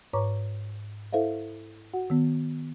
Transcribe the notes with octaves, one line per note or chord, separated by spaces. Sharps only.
G#2 B4 C#5 A#5 C#6 D6
E4 A4 C5 E5 F5
F#4 F#5
D#3 B3